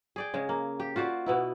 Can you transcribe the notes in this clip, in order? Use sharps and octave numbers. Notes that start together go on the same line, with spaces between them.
G#4 D5 G5
C#3 G#3
A#3
G4
F4 F#4 C5 D5
B2 B3 E4